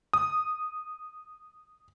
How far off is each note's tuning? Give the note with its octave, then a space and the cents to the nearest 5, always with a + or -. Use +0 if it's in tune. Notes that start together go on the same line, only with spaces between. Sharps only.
D#6 -10